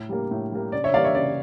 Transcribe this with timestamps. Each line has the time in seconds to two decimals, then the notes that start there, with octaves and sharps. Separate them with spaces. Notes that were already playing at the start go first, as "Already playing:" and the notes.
Already playing: A2
0.09 G3 A#3
0.31 A2
0.52 G3 A#3
0.72 C#3 D5
0.84 C#5 E5
0.94 E3 G3 A#3 D5 F5
1.04 C#5 E5
1.15 C#3 D5